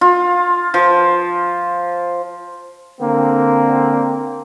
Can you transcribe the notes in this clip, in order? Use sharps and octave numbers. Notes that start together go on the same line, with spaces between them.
F4
F3
D3 A#3 C4